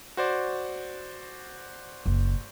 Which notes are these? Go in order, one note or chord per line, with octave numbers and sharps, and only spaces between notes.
F#4 C5 D5
F#1